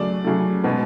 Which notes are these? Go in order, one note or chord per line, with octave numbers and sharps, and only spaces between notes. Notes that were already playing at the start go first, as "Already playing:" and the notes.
Already playing: C#3 F#3 A3 D5
C#3 F#3 A3
B2 G#3 B3